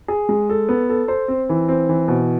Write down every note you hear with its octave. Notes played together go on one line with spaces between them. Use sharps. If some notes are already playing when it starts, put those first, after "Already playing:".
G#4
G#3
A4
B3
A4
C5
C4
E3
C4
E3
B2